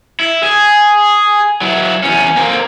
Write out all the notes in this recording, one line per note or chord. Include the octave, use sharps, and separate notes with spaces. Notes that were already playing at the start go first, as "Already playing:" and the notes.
E4
G#4
F#3 E4
E2 C#4
A#3 C4